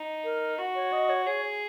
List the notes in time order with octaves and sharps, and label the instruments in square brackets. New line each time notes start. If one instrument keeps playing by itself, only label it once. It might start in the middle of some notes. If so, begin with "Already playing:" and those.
Already playing: [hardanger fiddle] D#4
[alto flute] A#4
[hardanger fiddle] F#4
[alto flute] C#5
D#5
C#5
[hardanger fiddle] G#4 [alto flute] C#5